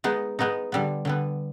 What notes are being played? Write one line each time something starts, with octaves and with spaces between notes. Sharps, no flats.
G#3 B3 D#4
G#3 B3 D#4
D3 G3 B3
D3 G3 B3